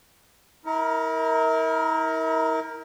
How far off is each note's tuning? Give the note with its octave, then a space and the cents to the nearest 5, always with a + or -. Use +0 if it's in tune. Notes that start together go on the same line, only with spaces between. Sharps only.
E4 -40 A#4 +0